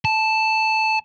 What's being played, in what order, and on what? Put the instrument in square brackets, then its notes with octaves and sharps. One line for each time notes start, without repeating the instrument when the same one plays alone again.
[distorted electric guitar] A5